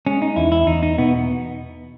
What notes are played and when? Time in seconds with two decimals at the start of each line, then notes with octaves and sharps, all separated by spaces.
0.07 G#3 C#4
0.22 D#4
0.36 E2 E4
0.52 E4
0.67 E2 D#4
0.83 D#4
0.98 B2 B3